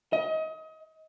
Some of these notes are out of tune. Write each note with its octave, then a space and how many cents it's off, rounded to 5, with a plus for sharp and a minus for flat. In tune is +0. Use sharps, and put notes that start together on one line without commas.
D#5 +30